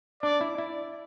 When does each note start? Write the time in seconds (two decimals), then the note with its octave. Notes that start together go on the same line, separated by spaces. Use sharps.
0.23 D4 D5
0.41 E4
0.58 E4